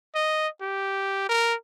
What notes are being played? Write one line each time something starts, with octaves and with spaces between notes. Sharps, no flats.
D#5
G4
A#4